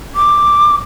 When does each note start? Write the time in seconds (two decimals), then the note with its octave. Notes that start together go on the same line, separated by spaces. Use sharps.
0.16 D6